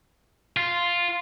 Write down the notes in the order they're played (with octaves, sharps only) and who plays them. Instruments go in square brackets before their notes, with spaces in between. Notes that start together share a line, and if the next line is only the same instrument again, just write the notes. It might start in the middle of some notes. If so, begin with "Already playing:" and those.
[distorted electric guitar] F4